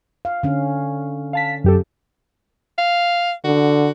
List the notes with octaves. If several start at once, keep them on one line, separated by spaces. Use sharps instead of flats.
F5
D3 C#4
F5 A5 B6
F#2 G4 A4
F5
D3 F#4